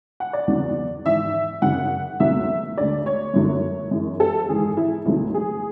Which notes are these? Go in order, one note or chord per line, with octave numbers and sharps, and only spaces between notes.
F#5
D5
E2 C#3 F#3
G#1 G#2 E3 E5
F#2 C#3 F#3 F#5
C#2 B2 F#3 A3 E5
D2 D3 G#3 D5
C#5
F#2 D3 F#3 A3
F#2 E3 G#3
A4
G#1 G#2 E3 G#3 G#4
E4
C#2 B2 F#3 A3 E4
G#4